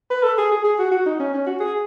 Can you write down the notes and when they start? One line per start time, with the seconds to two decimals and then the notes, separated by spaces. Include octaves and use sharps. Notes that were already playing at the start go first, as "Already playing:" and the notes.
0.10 B4
0.23 A4
0.38 G#4
0.51 G#4
0.64 G#4
0.79 F#4
0.91 F#4
1.06 D#4
1.19 C#4
1.33 C#4
1.46 F#4
1.60 G#4